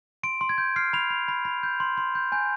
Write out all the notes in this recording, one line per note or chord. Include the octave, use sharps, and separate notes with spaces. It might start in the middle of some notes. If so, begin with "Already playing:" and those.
C6 D7
C6
G#6
G6
F6 C7
B5 F7
B5
B5
B5
G6
C6
C6
G6
G#5 G6